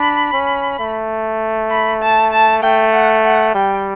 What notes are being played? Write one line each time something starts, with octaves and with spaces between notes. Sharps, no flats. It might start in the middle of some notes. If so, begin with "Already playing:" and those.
Already playing: D4 B5
C#4
A3
B5
A5
A5
A3 G5
F#5
F#5
G3 G5